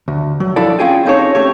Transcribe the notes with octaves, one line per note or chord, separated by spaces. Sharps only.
D2
F#3
F3 D4 E4 A4 D5
C4 C#4 F4 G#4 G5 G#5
C4 C#4 D#4 G#4 A4 C#5
A3 C#4 G4 C#5